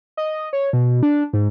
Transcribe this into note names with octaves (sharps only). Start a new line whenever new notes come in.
D#5
C#5
B2
D4
G#2